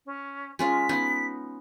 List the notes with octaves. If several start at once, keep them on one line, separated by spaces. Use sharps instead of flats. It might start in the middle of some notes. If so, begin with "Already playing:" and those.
C#4
G#3 C#4 F4 B6
B3 C#4 D#4